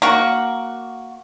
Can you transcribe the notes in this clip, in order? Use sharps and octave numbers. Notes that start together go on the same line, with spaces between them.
A#3 F#4